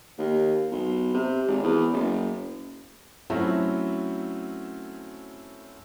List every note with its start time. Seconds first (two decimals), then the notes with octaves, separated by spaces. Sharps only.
0.18 D#2
0.72 B1
1.14 C3
1.47 G#1
1.64 E2
1.93 F#1
3.30 F#3 A3 C4 C#4 E4 F#4